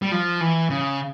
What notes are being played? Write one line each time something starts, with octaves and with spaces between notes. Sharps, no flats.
G3
F3
E3
C#3